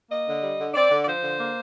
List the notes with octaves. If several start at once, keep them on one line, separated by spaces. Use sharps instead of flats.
A#3 D#5
D3
G3
D3
C4 D5
D3
D5
F3 C5
D3
A#3